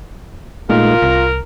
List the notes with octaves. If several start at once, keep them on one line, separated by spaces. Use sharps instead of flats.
A#2 G#3 A3 D#4 F4 A#4
C2 A#5